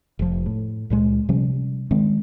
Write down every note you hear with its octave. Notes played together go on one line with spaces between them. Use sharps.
F1 F3
A2
C#2 A#2 G#3
C3 F3 G3 C#4
D#3 G#3 C4